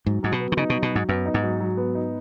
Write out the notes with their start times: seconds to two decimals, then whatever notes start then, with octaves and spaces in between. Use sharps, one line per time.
0.06 G#2 F#3
0.23 G#2 F#3
0.32 B2
0.40 B3
0.52 D#3
0.57 C#3 D#4
0.70 B2
0.74 F#3
0.83 B2
0.92 G#2 F#3
1.09 F#2 B3
1.26 D#4
1.34 G#2
1.43 F#3
1.60 F#3
1.77 B3
1.95 D#4